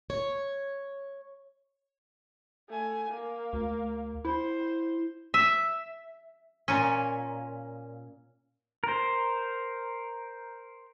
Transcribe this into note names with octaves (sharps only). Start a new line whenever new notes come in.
C#5
A3 G#5
A#3
D2
E4 C5
E5
A#2 C#4
A#4 C5